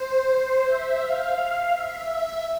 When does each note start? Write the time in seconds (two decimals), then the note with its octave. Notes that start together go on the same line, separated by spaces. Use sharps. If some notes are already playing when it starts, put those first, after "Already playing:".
Already playing: C5
0.65 E5
0.99 F5
1.70 E5
2.04 E5